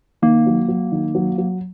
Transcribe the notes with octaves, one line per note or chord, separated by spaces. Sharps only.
D#3 A#3
F#3
F#3
D#3
F#3
F#3